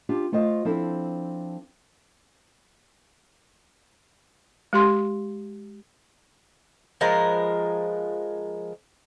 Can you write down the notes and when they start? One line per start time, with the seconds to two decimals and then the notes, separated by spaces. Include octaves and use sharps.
0.09 D4 F4 G4
0.32 A3 F4 C5 D#5 F5
0.65 F3 C4 D4 E4 A4
4.73 G#3 G4 C6
7.01 F3 G#3 A#4 B4